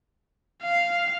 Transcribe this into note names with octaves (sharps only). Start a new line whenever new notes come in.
F5